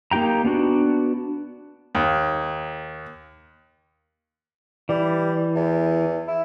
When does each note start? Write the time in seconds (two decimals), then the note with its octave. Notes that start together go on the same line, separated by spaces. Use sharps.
0.11 A#3 D#4 G4 G5 A#5
0.45 B3 D4 F#4
1.95 D#2
4.89 E3 G3
5.55 E2
6.28 E4